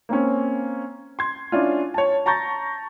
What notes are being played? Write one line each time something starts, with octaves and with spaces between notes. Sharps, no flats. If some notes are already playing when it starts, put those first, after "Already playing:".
A#3 C4 C#4
C6 G#6
C#4 D4 E4 F4
C#5 A5
A5 A#5 C#6 G6 A6 A#6